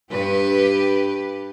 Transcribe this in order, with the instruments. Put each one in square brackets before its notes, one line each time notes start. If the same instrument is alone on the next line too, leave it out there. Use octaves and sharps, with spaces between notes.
[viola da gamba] G2 G4 B4